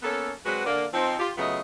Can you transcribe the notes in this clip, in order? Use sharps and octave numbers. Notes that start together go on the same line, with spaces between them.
A#3 B3 C#4 A4
F#3 G#3 C4 F#4 B4
D3 A#3 D5
F3 C4 D#4
F4 G4
C#3 F#3 A3 B3 F4 D#5